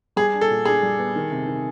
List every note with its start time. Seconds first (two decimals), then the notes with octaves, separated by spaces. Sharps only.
0.16 G3 G#4
0.34 D4
0.41 A4
0.50 A#2
0.65 D4 G#4
0.83 G3
0.99 B3
1.16 D#3
1.32 C3
1.47 D#3